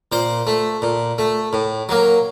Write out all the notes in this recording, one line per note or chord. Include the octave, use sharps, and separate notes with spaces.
A#2 C5
A3
A#2
A3
A2
F#3 A#3